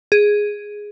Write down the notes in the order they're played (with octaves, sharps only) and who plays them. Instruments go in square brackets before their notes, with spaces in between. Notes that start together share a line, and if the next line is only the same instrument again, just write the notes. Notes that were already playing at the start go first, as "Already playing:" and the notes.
[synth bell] G#4